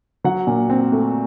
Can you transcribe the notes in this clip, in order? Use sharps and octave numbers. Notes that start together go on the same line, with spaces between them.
F#3 F#5
A#2
C4
A3